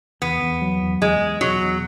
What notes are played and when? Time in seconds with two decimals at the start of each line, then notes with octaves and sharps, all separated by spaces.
0.22 E2 B3
0.42 E2
0.62 F#3
0.82 E2
1.01 E2 G#3
1.21 E2
1.41 B2 F#3
1.60 E2